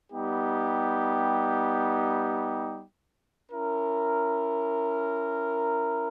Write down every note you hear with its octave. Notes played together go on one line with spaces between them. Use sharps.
G3 B3 D#4 G4
C#4 E4 A#4